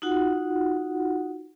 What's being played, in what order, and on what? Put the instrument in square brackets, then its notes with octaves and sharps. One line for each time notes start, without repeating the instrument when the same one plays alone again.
[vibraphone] D#4 F4 F#4 F#5